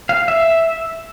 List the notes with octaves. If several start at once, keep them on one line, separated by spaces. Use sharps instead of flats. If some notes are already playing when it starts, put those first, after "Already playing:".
F5
E5